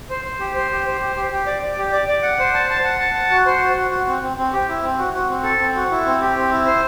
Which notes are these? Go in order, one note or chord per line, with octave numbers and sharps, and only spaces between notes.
C5
C5
G4
C5
G4
C5
G4
G4
G4
D5
D5
G4
D5
D5
F#5
C5
A5
A5
F#5
A5
F#5
F#4
C5
F#4
F#4
F#4
C4
C4
C4
G4
E4
C4
F#4
F#4
C4
A4
C4
F#4
E4
C4
G4
C4
E4
C5